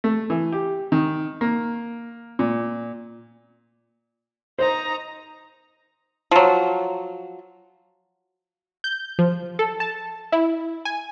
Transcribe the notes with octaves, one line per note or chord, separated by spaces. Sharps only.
A3
E3
G4
D#3
A#3
A#2
D#4 C5 A#5
F3 F#3
G6
F3
A4
A5
E4
G#5